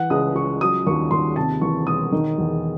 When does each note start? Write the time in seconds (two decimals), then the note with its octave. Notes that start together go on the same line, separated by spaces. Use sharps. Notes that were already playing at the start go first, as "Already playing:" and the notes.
Already playing: E3 F#5
0.10 C#2 D#6
0.35 C#2 C#6
0.61 F#3 D#6
0.87 D#2 C#6
1.11 D#2 C6
1.36 C3 A5
1.61 E3 C#6
1.87 E1 D#6
2.12 D#3
2.38 E2